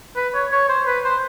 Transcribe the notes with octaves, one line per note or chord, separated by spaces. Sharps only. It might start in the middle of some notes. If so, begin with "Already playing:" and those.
B4
C#5
C#5
C5
B4
C5